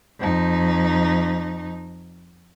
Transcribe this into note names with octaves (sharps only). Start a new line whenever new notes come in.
F2 D#4